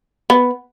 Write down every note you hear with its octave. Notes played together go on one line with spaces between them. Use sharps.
B3